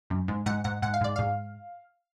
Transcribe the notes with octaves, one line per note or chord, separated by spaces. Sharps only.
F#2
G#2
G#2 F#5
G#2 F#5
G#2 F#5
F5
G#2 D5
G#2 F5